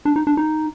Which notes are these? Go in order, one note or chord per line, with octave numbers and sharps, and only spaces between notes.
D4
D#4
D4
D#4